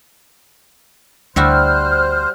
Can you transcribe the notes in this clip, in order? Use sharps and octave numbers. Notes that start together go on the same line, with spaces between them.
D2 G3 E4 F#4 C5 F6 F#6